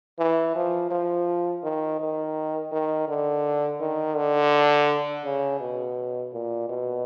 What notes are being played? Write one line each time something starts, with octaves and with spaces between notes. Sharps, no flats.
E3
F3
F3
D#3
D#3
D#3
D3
D#3
D3
C#3
B2
A#2
B2